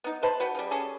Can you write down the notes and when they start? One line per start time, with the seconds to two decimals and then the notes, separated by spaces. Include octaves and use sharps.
0.04 B3 D#4
0.23 B4 C5 A5 B5
0.40 F#4 B4 F#5 G5
0.55 C#3 G3
0.71 G3 C#4 G#4 A4